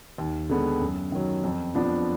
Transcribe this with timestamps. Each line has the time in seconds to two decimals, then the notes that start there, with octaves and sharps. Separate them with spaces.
0.18 D#2
0.50 D3 G#3 B3
0.81 F#2
1.12 D#3 F#3
1.44 F2
1.75 F3 B3 D4 F4